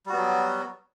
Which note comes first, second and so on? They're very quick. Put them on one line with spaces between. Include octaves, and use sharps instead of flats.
G3 F#4 B3 F#3